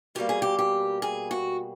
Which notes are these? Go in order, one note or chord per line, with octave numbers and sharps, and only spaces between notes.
B2 G3 A#3 G4
G#4
G4
G4
G#4
F#4